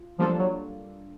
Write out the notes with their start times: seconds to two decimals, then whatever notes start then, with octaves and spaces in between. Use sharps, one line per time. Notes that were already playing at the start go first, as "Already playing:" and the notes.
Already playing: F4
0.19 F3 G3 A#3 D4 F4 A4
0.39 F#3